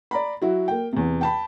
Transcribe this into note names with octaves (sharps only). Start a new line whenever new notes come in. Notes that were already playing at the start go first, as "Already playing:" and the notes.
D5 A#5 B5
F#3 E4 F#4
A#3 G5
E2 C3
G5 A5 B5